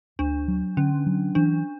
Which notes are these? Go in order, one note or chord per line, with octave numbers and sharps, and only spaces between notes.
D2 D4
F#3
D3 C#4
F#3
E3 D4